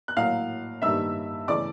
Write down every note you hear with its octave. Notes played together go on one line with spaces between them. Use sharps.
F#6
A2 F#3 A#3 F5 F6
G2 D#3 G3 A#3 E5 E6
C#3 E3 A3 D5 D6